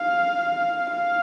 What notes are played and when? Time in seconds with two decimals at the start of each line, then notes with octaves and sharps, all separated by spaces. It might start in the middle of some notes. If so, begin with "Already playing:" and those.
Already playing: F5
0.90 F5